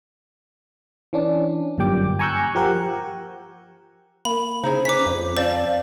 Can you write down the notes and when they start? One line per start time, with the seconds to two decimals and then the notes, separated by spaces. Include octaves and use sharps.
1.13 E3 C#4 D4
1.78 G1 F#2 A#2 G3 G5 D6
2.19 G#5 A#5 C#6 E6 F#6 G6
2.55 F3 G4 A#4 F#5
4.25 A#3 B5
4.63 C#3 D#4 E4 G#4 C5
4.85 C#4 B4 C#5 D6 B6
5.06 F2
5.37 C4 C5 D5 F5 A5